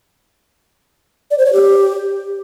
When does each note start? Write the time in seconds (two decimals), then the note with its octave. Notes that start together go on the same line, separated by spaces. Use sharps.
1.31 D5
1.38 C5
1.45 C#5
1.53 G4